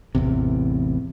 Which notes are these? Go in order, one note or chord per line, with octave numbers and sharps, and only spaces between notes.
A1 E2 C3